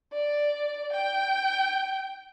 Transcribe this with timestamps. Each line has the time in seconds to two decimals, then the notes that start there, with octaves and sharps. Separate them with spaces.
0.13 D5
0.93 G5